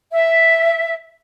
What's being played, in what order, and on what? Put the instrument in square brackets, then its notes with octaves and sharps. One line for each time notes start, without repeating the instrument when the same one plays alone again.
[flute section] E5